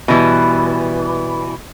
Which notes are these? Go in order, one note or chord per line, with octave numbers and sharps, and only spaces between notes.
B2 E3 G3